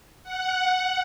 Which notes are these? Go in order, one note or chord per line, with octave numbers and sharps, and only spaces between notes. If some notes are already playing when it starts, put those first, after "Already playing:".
F#5